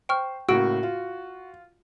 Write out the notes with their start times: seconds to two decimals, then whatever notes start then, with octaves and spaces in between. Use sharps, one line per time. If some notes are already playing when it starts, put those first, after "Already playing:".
0.09 C5 G5 C#6 F6
0.49 A2 C#3 A#3 F#4 E6 D7
0.83 F4